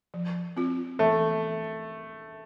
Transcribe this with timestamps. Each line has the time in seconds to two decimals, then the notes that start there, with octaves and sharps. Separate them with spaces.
0.14 F3
0.57 C4 F4
0.99 E3 A3